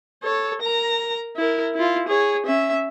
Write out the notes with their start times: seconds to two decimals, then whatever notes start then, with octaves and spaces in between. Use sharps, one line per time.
0.23 A4 C#5
0.62 A#4 A#5
1.36 E4 A#4
1.74 E4 F4
2.08 G#4 C#5
2.46 C#4 E5